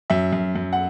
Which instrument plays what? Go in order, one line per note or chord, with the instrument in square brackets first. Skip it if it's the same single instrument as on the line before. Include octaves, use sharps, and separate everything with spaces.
[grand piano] F#2 E5
F#2
F#2
F#5